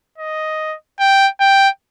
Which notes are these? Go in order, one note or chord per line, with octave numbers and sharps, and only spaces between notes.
D#5
G5
G5